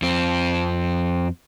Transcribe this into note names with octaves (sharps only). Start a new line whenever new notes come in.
F2 C4